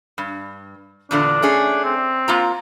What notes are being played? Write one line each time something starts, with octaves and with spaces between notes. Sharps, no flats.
G2
E2 A#2 D3 D4
A3 C#4 G#4
C4
A#3 F4 A#5